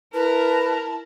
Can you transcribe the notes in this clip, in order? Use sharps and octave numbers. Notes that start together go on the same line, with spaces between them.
E4 A#4 B4 A5